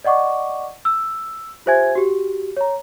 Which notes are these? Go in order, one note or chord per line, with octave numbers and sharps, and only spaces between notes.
D5 D#5 F#5 C#6 D6
E6
F4 G4 C5 E5 G#5 G#6
F#4 G4
C#5 A#5